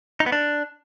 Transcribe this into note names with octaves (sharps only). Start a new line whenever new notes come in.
D#4
B3
D4